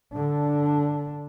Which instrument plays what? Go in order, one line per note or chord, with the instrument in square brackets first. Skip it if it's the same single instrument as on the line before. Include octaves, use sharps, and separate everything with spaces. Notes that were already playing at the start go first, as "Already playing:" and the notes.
[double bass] D3 D4